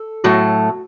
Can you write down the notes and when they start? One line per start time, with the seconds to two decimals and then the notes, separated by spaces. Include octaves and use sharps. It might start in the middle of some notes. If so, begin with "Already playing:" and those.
Already playing: A4
0.24 A2 F#3 A3 F#4